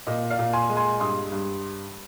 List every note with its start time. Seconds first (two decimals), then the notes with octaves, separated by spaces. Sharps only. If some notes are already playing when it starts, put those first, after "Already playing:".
0.07 A#2 D#5
0.30 D5 F5
0.39 A#2
0.53 G#5 C6
0.69 G#3
0.77 G#5 C6
1.00 G2 C6 D#6
1.32 G2